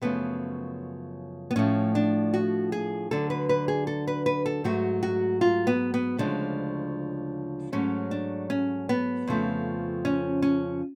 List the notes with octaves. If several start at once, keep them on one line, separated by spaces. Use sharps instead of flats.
F#2 C#3 F3 A3 B3
B3
A2 F3 A3 C#4
D4
F#4
G#4
D2 D3 F#3 A4
B4
B4
G#4
A4
B4
B4
A4
G#2 F#3 A3 F#4
F#4
F4
B3
B3
D2 C#3 F3 G#3 D4
G#2 F#3 A3 C#4
D4
C#4
B3
F2 C#3 F3 A3
C#4
C#4